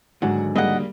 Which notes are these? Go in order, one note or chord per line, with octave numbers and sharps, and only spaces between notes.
D#2 G#2 D3 F#3 F#4
G3 G#3 A#3 D#5 F#5